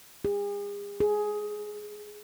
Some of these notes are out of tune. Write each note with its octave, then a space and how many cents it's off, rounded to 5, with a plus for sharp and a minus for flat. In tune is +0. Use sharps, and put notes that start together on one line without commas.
G#4 -40
G#4 +10